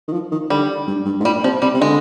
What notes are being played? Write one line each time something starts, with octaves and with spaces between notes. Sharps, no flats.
D#3
F3
D#3
D3 G3
G2
G2
G#2
A#2 G3
C3 F3
C3 G3
C3
D3 G#3